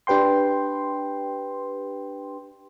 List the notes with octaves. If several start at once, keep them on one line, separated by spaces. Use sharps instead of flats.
D4 G4 B4 G5 C6